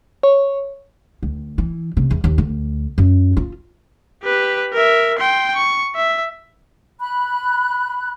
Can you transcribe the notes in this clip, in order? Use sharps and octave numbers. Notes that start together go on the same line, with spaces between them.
C#5
D2
E3
C3
E2
D#2
D2
F#2
F4
G4 B4
A#4 E5
G5 C6
C#6
E5
B5 F#6